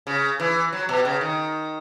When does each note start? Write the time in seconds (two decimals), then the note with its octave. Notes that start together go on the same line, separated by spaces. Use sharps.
0.07 C#3
0.40 E3
0.73 F#3
0.89 B2
1.05 C#3
1.21 D#3